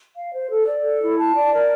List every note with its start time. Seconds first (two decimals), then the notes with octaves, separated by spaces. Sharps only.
0.15 F5
0.32 C5
0.50 A4
0.66 D5
0.83 A4
1.00 E4
1.18 A5
1.35 D5
1.52 A#4